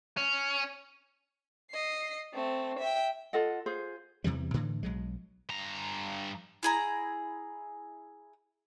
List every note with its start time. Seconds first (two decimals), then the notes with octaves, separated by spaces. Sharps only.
0.17 C#4
1.71 D#5 C7
2.33 A3 C4
2.79 E5 G5
3.33 F4 A4 D#5 F#5
3.66 F4 G#4 C5
4.24 E2 C3 E3 G3
4.54 A2 D3 E3
4.83 B1 F#3 G#3
5.49 G2 A#5
6.63 E4 G#4 A#5